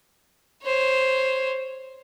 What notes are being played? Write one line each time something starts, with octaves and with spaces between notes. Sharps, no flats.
C5 C#5